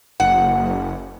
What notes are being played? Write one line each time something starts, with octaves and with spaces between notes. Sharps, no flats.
F#1 F#5